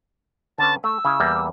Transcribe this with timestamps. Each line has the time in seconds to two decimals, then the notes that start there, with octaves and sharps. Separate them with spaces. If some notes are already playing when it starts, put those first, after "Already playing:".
0.58 D3 C#4 B4 A5
0.84 A3 E6
1.05 C#3 E4
1.20 E2 G3 A#3